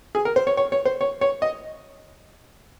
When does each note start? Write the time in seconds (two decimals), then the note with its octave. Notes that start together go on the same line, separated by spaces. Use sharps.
0.15 G#4
0.25 A#4
0.36 C5
0.47 C#5
0.57 C#5
0.72 C#5
0.85 C5
1.01 C#5
1.21 C#5
1.42 D#5